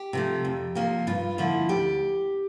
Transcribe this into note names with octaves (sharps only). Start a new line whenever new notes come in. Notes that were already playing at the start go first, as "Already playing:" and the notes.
Already playing: G4
C3 F3 A3
F2
C3 F3 A#3
G2 F4
D3 F3 A#3 E4
D2 G4